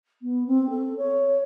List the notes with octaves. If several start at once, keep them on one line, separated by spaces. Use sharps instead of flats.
B3
C4
A4
C#5